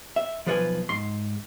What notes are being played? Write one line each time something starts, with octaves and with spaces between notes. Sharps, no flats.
E5
B1 F3 F4 B4 C#5 G#5
G#2 C6